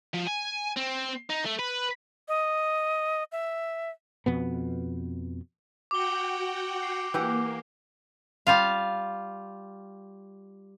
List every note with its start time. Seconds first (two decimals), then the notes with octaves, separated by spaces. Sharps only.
0.14 F3
0.27 G#5
0.77 C4
1.30 D#4
1.45 A3
1.59 B4
2.28 D#5
3.32 E5
4.26 F2 B2 B3
5.91 F#4 F#5 G5 D6 G7
6.83 C7
7.14 E3 A#3 G4 F#5
8.47 G3 F4 F5